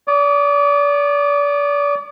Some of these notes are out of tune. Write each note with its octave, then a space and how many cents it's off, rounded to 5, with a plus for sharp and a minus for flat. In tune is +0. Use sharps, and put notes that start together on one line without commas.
D5 -35 D6 +45